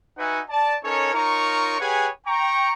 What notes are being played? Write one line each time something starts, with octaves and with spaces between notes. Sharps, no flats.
D#4 F#4 B4 E5 F#5 G#5
D5 A5
C#4 D#4 A4 A#4 C#5
D#4 F4 A#4 C#5 A#5 C#6
G4 G#4 B4 C#5 F#5 G#5
G5 A#5 C#6